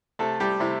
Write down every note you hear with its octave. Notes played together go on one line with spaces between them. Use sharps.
C3 A3 A4
G3 G4
C3 A3 E4